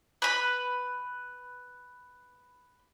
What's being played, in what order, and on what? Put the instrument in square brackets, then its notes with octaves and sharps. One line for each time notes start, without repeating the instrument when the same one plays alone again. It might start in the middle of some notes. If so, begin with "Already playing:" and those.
[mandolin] B4 B5